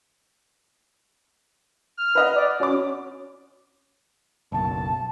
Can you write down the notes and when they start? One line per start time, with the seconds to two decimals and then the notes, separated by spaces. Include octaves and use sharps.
1.97 F6
2.15 B4 D#5 F#5
2.36 D5
2.60 C#4 F#4 D6
4.52 F#1 B1 A5